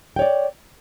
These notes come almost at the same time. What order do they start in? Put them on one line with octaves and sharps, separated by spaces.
G5 C#5 D5